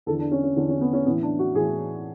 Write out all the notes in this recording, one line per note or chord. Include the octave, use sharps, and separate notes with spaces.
E2 D3 A4
D4
C#4
C#4
E2 D3 C#4
C#4
B3
C#4
A2 E3 B3
D4
F#4
A2 E3 G#4